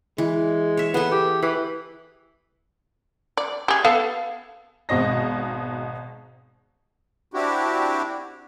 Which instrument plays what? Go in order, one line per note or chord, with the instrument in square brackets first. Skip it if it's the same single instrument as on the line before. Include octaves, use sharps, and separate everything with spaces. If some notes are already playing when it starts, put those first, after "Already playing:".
[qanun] E3 [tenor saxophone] G#3
[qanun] C#5 E5
[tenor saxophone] B3 [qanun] G#4 A4
[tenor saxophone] G4
[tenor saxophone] E3 [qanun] B5
[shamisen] D5
G4 G#4
B3 A4 F5
[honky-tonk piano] G#1 G#2 B2 C4 D#5 A#6
[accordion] C4 D4 E4 F#4 G4